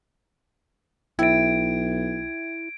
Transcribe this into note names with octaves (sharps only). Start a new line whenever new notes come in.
B1 E4 E5 G5 G#6 D7